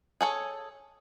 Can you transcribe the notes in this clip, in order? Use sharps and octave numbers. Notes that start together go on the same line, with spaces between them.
G#4 A4 C#5